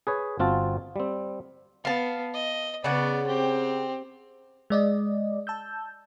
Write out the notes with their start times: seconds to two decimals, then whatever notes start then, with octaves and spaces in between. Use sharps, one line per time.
0.07 G#4 B4 C#5
0.39 G1 C4 F4 F#4 A5
0.96 G3 C4
1.85 B3 F5 A5
2.34 D#5
2.84 C#3 B3 D5 F#5
3.27 C4 G4
4.70 G#3 D5 D#5
5.47 A5 E6 G6